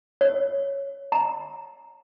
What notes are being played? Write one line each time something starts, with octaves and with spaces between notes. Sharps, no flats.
C#5
A#5